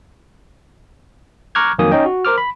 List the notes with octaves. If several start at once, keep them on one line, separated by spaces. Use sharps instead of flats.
A#5 C#6 D6 F6 F#6 G#6
F2 D#3 F#3 A#3 G#5 D#6
C#4 D#4 C#5 D#5 G5
F#4
A#4 C5 D6 F6
B5